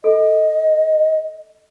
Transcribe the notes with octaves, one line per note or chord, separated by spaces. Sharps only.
A4 D#5